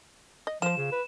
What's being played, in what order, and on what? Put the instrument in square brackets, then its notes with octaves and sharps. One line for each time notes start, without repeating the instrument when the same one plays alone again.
[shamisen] D#5
[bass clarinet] F3 [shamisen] F4 C5 [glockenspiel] E7
[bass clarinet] C#3
B4